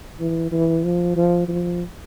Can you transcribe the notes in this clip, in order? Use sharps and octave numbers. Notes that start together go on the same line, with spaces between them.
E3
E3
F3
F3
F3